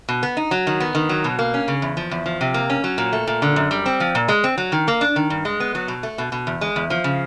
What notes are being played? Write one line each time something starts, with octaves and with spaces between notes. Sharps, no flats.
B2
B3
D#4
F#3
D#3
B3
D#3
F#3
B2
A#3
C#4
C#3
E2
F3
E2
F3
C3
A#3
C#4
F#3
A#2
A3
A#2
D3
F#2
G3
C4
F3
A#2
G#3
C4
F#3
D#3
A#3
D4
D#3
G2
G#3
B3
F#3
B2
A3
B2
B2
E2
G#3
E2
F3
C#3